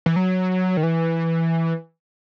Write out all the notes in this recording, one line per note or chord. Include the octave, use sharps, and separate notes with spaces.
E3
F#3
D#3
E3